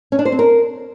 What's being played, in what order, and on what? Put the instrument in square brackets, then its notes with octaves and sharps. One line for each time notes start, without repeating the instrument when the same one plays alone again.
[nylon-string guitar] C#4
D4
C5
C4
A#4